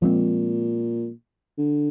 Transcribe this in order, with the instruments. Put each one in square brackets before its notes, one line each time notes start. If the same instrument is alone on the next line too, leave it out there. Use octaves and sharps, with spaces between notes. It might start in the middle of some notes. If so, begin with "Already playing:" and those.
[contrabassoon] A#2 [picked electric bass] F3 G#3 C4
[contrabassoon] D3